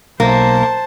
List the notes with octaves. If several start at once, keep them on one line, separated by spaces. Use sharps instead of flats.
B1 A#3 C5 A5